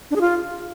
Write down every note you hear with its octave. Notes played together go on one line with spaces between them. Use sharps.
D4
G#4
F4